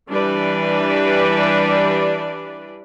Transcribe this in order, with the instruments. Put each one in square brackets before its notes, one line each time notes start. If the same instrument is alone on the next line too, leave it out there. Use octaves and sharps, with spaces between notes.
[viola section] E3 G3 D4 B4 D5